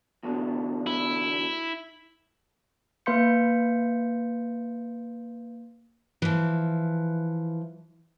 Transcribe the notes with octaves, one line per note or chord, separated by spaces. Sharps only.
E2 B2 D3
E4
A#3 B4 F5 C6 G6 C#7
E3 F3